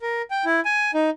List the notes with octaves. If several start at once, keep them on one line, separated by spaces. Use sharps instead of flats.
A#4
G5
E4
G#5
D#4